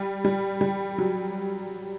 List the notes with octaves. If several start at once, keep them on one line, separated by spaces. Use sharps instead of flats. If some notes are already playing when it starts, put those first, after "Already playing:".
Already playing: G3
G3
G3
F#3